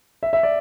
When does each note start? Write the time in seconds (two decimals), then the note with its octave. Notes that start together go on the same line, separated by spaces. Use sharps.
0.23 E5
0.33 E5
0.43 D5